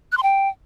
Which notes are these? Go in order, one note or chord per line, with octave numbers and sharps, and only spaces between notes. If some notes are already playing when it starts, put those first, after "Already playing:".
F#6
C6
G5